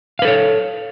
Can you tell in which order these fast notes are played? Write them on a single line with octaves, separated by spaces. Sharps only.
F5 B4 A4 C#5